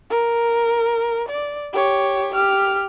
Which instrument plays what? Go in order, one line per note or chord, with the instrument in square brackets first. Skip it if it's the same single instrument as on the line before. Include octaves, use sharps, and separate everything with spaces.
[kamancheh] A#4
D5
G4 C#5
G4 F6